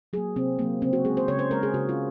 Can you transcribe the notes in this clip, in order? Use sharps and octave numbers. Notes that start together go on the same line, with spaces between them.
F#3 A#3 G#4
C3 C4
F#3 A#3
C#3 C4
F#4
G#3 G#4
C5
C#3 C#5
C5
G#3 A#4
G#4
C#3 F#4
F4